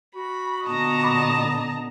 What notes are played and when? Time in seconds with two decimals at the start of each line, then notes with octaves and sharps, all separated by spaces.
0.15 F#4 B5
0.66 A#2 D3 B3 D#5 A5 A#5
1.03 B5 D6